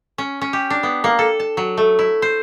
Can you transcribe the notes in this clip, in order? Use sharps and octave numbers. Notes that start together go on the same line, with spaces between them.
C#4
C#4
G4
D4
B3
A#3
A4
A5
F#3
A3
E4
C5